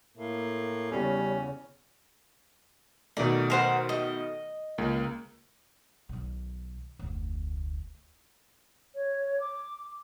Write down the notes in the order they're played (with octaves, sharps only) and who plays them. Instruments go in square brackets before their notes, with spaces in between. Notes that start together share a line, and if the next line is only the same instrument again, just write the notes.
[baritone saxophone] A2 [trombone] A#3
[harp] E2 C#3 [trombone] G3 [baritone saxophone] C#4
[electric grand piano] B2 D#3 A3 [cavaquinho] D5 A#5
[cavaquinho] A#4 C5 F#5
D#5
[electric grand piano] C#2 A#3
[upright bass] B1 D#3
F1 D2
[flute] C#5
D6